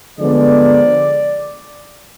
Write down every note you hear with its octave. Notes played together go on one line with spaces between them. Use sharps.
D3 F3 G#3 B3 D5